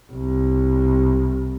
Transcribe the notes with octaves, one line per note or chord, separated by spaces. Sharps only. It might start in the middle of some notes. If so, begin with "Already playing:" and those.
C2